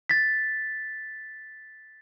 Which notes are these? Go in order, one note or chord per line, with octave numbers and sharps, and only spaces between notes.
A6 B6